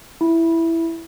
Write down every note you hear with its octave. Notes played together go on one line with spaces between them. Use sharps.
E4